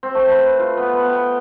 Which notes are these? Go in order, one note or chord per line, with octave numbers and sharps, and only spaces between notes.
C4
A3
B4
F4
B3
B3
G5